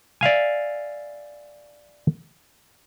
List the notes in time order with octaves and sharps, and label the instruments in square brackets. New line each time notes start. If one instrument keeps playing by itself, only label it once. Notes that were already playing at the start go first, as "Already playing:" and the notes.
[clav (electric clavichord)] D5 E5 F5 G#5